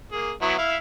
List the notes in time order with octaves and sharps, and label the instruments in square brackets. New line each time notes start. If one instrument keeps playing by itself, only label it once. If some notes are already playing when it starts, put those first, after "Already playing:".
[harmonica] A#3 G#4
F#3 B3 E4
E4 E5 F5